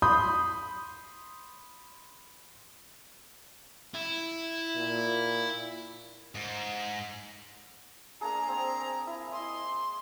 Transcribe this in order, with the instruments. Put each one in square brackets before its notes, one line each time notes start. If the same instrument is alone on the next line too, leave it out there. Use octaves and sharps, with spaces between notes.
[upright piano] B5 C6 D#6 G6
[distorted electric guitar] E4
[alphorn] A#2
[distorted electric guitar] G#2
[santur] A#3 D4 G#4 [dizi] A#5
[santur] C4
E4
[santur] D#5 [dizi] C6